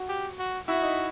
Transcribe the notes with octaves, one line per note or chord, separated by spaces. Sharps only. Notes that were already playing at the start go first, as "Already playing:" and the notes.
Already playing: F#4
G4
F#4
E4 F#4
D#4